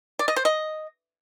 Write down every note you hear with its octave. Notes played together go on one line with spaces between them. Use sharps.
D5
D#5
C5
D#5